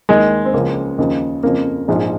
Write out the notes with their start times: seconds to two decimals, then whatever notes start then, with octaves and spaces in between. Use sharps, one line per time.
0.09 D#2 D#3 G#3
0.45 C4
0.54 C#2 C#3 F3 A#3
0.98 D#2 C#3 F3
1.43 F2 C#3 F3 A#3
1.88 A#1 G#2 F3